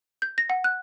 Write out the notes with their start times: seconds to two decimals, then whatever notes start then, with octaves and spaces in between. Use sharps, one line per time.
0.22 G6
0.38 A#6
0.50 F#5
0.64 F#6